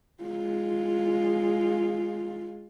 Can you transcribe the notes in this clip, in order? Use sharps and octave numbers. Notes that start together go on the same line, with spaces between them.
G#3 F4